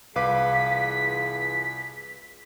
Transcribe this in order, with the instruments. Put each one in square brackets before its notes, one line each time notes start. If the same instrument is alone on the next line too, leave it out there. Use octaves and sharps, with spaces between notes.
[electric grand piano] C2 B4 D6 [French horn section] E3 F4 G#4 [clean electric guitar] F5 [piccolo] B6